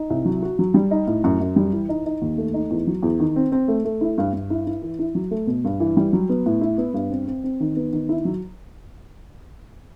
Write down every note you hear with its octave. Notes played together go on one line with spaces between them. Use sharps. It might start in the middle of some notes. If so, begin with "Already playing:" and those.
Already playing: D#4
C2
F#3
F#4
F#3
G3
D#4
A2
F#2
F#2
G3
E3
D#4
D#4
D#2
A3
D#4
E2
F#3
E2
D#3
C4
C4
A3
A3
E4
G2
G2
E4
E4
E3
E4
F#3
A3
B2
G2
E3
G3
F#3
B3
A2
E4
B3
G2
C4
C4
C4
D#3
B3
D#3
E4
F#3